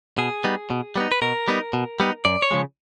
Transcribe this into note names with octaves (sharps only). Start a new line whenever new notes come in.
B2 G#4
G3 B3 D#4
B2
G3 B3 D#4
B4
B2 A#4
G3 B3 D#4
B2
G3 B3 D#4
F#2 D5
C#5
C#3 F3 G#3